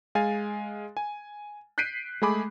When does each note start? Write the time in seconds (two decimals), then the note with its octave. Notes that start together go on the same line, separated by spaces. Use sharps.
0.15 G#3 F5 G#5 A6
0.97 G#5
1.78 F#6 G6 B6 C7 D7 D#7
2.22 G#3 A3 G#4 B5 D6